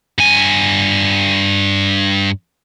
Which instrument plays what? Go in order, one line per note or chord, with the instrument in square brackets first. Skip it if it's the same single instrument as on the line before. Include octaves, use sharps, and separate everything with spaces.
[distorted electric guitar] G2 G#5